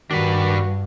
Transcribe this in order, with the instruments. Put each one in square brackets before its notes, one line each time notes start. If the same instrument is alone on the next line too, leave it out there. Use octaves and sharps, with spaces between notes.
[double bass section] G2 [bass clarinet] D#3 [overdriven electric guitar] D4 B4 [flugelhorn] F#4